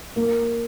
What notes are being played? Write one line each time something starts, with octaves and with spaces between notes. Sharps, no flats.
A#3